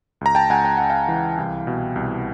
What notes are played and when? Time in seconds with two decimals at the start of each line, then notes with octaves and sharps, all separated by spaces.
0.21 C#2 A#5
0.35 G5 A5
0.50 C#2 F#5 G#5
0.65 G5
0.77 C#2 F#5
0.90 F5 G5
1.08 E3
1.38 C2
1.67 B2
1.96 C2